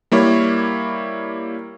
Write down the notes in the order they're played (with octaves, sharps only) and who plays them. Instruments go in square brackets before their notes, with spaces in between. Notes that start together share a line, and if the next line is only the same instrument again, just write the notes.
[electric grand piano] G3 A#3 E4 C#5